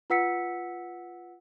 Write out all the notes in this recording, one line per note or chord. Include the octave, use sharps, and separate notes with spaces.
F4 B4 F#5 E6 B6 C#7